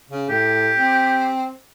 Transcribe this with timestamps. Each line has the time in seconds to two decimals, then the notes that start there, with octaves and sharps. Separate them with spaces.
0.10 C#3
0.30 A2 G4
0.76 C4